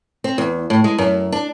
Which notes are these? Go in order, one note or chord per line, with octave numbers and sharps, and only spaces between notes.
C4
E2
A2
G#3
F#2
D4